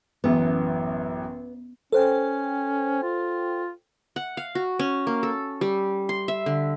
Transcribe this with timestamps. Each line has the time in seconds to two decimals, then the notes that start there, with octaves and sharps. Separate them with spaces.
0.24 A1 F#2 E3 B3
1.92 C#4 A4 C5 G5
3.02 F4
4.16 F#5
4.37 F5
4.55 F#4
4.79 C#4
5.07 A#3
5.23 A4
5.61 G3
6.09 C6
6.28 E5
6.46 D3